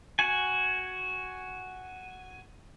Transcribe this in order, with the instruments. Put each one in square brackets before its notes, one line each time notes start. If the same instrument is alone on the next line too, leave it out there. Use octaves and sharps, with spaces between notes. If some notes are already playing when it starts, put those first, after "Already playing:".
[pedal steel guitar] F#4 G#5